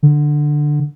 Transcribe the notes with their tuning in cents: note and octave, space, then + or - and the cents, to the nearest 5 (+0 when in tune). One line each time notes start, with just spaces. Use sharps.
D3 +10